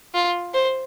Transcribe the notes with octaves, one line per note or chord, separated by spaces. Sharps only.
F4
C5